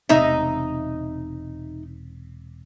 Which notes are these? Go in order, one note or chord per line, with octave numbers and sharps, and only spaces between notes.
E1 C3 D#4 E5